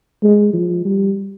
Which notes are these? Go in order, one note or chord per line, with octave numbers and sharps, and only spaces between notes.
G#3
F3
G3